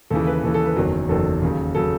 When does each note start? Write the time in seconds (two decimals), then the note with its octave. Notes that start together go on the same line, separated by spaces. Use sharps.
0.10 D#2 C#3 E3 A4
0.27 B4
0.43 D#2 C#3 E3 A4
0.54 A4
0.66 B4
0.76 F#1 E2 D#3 F#3
1.09 F#1 E2 D#3 F#3 A4
1.42 D#2 C#3 F#3
1.75 C#3 F#3 A4